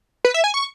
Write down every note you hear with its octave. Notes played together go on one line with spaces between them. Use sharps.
B4
E5
G#5
C#6